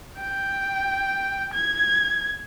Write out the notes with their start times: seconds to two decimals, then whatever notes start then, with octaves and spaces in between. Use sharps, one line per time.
0.20 G5
1.53 G#6